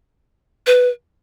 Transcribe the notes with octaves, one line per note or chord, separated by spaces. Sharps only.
B4